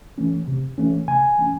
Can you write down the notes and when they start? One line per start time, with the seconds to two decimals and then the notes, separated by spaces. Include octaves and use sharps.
0.18 E3 A3 C#4
0.48 C3
0.78 E3 A3 C#4
1.08 C3 G#5
1.38 E3 A3 C#4